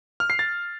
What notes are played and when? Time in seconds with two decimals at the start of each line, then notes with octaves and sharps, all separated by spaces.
0.20 F6
0.30 C7
0.39 A6